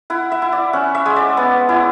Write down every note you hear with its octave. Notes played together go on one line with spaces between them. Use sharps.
E4 F#5
E5
E4
D5
C#4 F#5
E5
G#3
D5
B3
E4